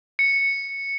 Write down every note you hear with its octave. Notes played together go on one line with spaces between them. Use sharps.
C#7